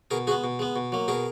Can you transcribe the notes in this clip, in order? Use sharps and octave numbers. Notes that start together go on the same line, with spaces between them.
B2 G#4 A#4
G#3 B3 F#4 G#4
B2
G#3 B3
B2
F#3 A#3
B2 G#4 A#4